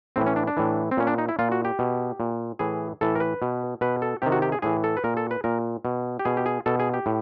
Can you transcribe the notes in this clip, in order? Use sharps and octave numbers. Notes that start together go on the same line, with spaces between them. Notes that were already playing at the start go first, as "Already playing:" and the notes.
A2 E3 C4
C#4
D4
D4
A2 E3
C4
A#2 C#4
D4
D#4
E4
A#2 F4
F#4
G4
B2
A#2
A2 E3 G#4
A2 E3 A4
A#4
B4
B2
B2 B4
A4
C3 D#3 G4
F#4
G4
G#4
A2 E3 G#4
A4
B4
A#2 A#4
A4
B4
A#2 A#4
B2
G4
B2 G#4
G4
G#4
B2 A4
G#4
G4
A2